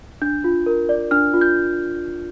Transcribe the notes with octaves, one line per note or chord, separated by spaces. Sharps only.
D4 G6
F4
A#4
D5
D4 F6
F4
G6